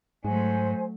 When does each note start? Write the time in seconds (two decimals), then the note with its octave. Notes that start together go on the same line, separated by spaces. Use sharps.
0.25 G#2 F#3 A3 C5 G#5